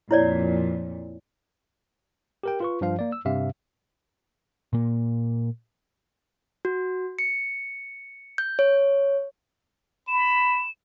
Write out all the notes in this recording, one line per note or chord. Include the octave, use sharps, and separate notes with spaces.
F2 A#2 E4 C#5 D5
G4 A#4 G5
F4 B4 C#6
G2 F3 F5
A#3 D5
E6
G2 C3 E5 F5
A#2 A#3
F#4
C#7
G6
C#5
B5 E7